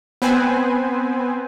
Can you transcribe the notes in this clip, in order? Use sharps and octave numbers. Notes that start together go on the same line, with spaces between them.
B3 C4 B4 C5 G#5